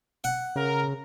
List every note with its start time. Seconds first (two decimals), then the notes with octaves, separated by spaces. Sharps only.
0.24 F#5
0.56 C#3 A#4